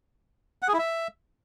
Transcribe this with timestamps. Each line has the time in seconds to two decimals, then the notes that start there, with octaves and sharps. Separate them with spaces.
0.62 F#5
0.68 G#4
0.73 E4
0.79 E5